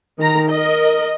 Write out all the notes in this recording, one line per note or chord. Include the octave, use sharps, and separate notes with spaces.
D#3 A#5
A#4 D#5